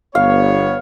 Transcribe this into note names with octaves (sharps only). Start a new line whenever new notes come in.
G1 B3 C#5 F5